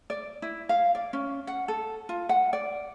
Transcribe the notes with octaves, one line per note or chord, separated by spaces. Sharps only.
D5
E4
F5
D5
C#4
F#5
A4
F4
F#5
D5